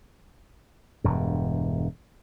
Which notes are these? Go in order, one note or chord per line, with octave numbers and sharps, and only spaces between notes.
E1 G2